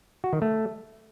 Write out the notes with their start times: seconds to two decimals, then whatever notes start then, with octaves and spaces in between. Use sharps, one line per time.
0.24 F#4
0.33 D#3
0.42 A3